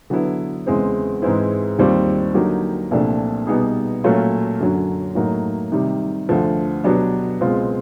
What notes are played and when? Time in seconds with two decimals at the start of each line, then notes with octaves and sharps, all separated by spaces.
0.10 D3 F#3 B3 E4
0.67 E2 C#3 E3 G#3 C4
1.22 G#2 E3 G#3 C4 E4
1.78 D#2 D#3 G3 C4 F4
2.34 D3 F#3 A#3 D#4 G4
2.91 C2 A#2 F3 A3 D4
3.47 B2 G3 B3 D#4 G#4
4.04 A#2 F#3 A3 C#4 F4
4.60 F#2 D3 F#3
5.15 A2 F#3 A#3 D#4 F#4
5.72 C3 D#3 G3
6.29 D2 D3 F3
6.84 B2 F#3 B3 D4 G4
7.40 C#2 B2 G#3 C4 F4